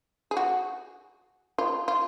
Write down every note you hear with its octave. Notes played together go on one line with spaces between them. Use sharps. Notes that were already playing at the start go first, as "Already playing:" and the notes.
G#4
F#4
F4
F4